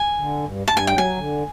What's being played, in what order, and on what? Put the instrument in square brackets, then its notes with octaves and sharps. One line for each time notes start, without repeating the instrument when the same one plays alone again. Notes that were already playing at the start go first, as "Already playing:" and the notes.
Already playing: [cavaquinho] G#5
[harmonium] D3
G2
[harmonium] G2 [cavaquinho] A5
[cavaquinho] G#5
[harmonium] F#3 [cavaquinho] G5
[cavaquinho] G#5
[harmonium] D3